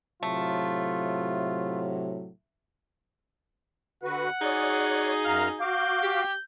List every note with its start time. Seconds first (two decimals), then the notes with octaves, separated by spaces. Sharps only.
0.23 A2 C3 F#3 A3 F4
4.03 D3 F#4 B4 F#5
4.42 D#4 F#4 G#4 C#5 D5
5.25 F#2 F5 A#5 F6
5.60 F#4 F5 D6 G6
6.03 G4